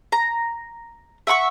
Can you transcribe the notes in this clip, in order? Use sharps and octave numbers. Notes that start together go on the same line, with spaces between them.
A#5
E5 F#5 B5 C#6